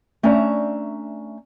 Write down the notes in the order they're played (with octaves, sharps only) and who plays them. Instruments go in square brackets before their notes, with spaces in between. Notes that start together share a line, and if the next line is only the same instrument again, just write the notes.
[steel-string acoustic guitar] A3 C#4 D4 E5 A#5